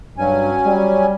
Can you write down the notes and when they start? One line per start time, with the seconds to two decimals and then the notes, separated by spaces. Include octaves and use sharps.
0.18 G2 F#3 C#4 G#5
0.66 G3